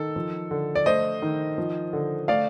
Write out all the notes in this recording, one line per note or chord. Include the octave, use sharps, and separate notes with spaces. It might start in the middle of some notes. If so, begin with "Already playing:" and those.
Already playing: D#3 A4
F3
D3
D5
A3 C5 D#5
D#3
F3
D3
A3 D5 F5